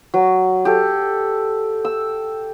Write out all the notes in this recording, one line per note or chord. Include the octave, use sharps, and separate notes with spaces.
F#3
G4 A4
E6